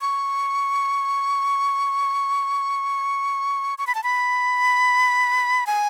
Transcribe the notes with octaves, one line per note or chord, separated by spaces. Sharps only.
C#6
C#6
B5
A5
B5
G#5